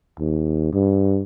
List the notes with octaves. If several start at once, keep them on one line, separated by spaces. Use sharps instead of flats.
D#2
G2